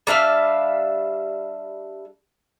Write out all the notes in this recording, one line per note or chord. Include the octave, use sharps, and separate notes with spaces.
G3 D4 E5 F5